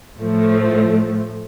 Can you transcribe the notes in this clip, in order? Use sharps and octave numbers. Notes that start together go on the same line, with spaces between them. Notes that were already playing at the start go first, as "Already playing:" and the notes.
A2 F3 A3